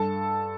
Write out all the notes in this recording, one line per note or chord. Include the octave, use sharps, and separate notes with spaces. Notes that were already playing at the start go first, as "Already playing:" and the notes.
Already playing: G2 A4 A5